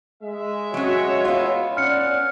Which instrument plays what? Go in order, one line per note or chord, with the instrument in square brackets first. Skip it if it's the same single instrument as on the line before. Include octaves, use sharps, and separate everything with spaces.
[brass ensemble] G#3 E5
[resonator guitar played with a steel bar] F#3 C#4 [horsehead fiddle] F#4 C#5
[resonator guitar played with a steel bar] B3 F4
[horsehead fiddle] C#4 [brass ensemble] D5 F#5 [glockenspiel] F6 C#7